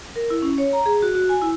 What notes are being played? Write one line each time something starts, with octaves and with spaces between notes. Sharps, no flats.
A#4
E4
C#4
C#5
A#5
G#4
F#4
F#4
G#5
E4